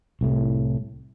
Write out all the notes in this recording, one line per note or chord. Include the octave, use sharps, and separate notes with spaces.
C2 A2